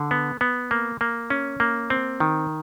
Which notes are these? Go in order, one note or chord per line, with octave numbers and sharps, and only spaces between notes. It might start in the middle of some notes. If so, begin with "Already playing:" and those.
Already playing: D3
B3
B3
A#3
A#3
C#4
A#3
C4
D#3